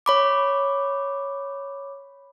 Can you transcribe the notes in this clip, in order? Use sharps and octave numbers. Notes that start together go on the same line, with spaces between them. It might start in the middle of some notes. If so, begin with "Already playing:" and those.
C#5 B5 D6